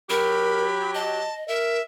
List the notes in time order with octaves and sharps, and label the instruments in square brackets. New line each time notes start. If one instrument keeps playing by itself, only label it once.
[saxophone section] F#3 G4 [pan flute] A#4 [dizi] B5
[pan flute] D#5 [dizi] A5
[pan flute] A#4 [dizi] E5